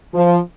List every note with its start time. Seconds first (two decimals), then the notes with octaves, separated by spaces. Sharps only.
0.14 F3